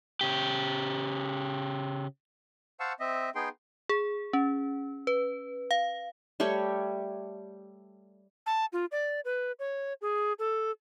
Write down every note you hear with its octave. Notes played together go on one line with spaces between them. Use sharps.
C#3 G4
C5 F5 F#5 A5 C#6 E6
C4 D#5 E5
B3 D#4 G#4 G5 C6
G#4
C#4
B4
F5
G3 A3 G4 C#5
A5
F4
D5
B4
C#5
G#4
A4